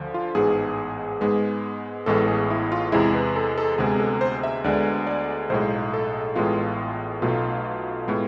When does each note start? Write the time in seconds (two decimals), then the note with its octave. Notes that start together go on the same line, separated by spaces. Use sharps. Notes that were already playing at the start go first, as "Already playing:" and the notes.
Already playing: D2 D3 F3
0.14 F4
0.35 A1 G#2 G#3 B3 G#4
1.21 G#2 G#3 B3
2.06 A1 A2 G#3 B3 A4
2.28 G#4
2.50 E4
2.72 F4
2.92 E2 C3 G#3 E4
3.15 B4
3.36 A4
3.58 A4
3.78 D2 C3 G#3 B3 G#4
3.99 A4
4.21 C5
4.43 E5
4.64 D2 D3 G#3 B3 D5
5.07 D5
5.50 B1 A2 G#3 C5
5.94 A4
6.36 A1 A2 G#3 B3 F4
7.22 B1 B2 A3 F4
8.07 A2 G#3 B3